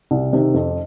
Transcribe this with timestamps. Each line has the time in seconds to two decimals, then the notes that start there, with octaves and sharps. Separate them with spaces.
0.11 C2
0.33 C3 D#3
0.54 F2